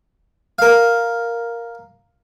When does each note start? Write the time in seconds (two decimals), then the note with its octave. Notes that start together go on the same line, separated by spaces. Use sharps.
0.59 A#4 F5